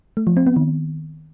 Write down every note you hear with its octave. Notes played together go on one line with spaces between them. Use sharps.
A3
F3
C4
B3
D#3